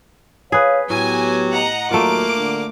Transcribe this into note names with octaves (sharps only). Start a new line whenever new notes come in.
G#4 B4 C#5 F5
A2 F#3 B3 G4 G#5
D#5 F#5 A#5
D#2 F#3 A3 A#3 F4 A#5 D6
D3